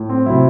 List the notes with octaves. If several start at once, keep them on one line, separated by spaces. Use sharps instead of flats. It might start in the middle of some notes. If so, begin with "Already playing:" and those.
Already playing: A2
C4
C3 F#3 E4